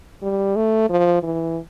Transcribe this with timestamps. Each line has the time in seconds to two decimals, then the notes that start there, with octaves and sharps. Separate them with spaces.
0.22 G3
0.56 A3
0.90 F3
1.23 E3